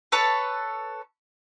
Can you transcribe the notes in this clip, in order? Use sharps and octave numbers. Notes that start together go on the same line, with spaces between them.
A4 B4 C#5 A5